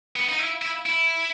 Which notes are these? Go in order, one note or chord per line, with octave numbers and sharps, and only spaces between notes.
B3
D#4
E4
E4
E4